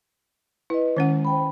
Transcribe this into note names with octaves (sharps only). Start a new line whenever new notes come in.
E4 B4 D#5
D#3 G#3 C#4 F#5
C5 G5 B5